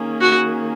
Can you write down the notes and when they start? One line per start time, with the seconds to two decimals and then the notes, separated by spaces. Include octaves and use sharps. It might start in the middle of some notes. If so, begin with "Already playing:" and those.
Already playing: D#3 A#3 C#4 G#4
0.21 F#4